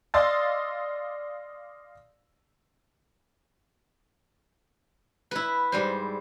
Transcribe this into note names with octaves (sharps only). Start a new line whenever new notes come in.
D5 D#5 F5 C6 E6 A6
E4 B4
G#2 G3 C5